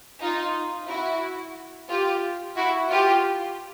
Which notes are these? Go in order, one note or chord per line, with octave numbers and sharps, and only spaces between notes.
D#4 F4
E4 F#4
F4 G4
E4 F#4
F4 G4